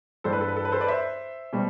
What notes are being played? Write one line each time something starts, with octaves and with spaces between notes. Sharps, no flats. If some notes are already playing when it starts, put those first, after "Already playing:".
G2 E3 G3 D4 A4 C5
B4
A4
B4
A4
B4
A4 C5
B4 D5
C5 E5
B2 G3 C4